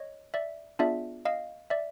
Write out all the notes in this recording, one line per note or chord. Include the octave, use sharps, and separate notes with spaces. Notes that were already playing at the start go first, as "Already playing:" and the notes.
Already playing: C#5 D#5
D5 E5
B3 D4 F4 G#4 D5 E5
D#5 F5
D5 E5